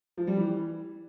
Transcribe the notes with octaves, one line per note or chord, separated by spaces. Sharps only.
F3
G3
E3